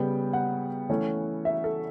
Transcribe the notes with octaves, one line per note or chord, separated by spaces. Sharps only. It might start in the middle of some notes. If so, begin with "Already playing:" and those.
Already playing: C#3 G3 B3 G5
F#5
E3 A3 C#4
E5
A4